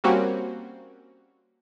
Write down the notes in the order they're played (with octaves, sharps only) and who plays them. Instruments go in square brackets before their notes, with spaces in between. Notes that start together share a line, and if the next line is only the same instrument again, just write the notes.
[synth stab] G3 A#3 C4 C#4 F#4